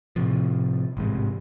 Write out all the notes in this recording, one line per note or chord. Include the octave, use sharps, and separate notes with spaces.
A2 C3 F3
A1 G#2 C3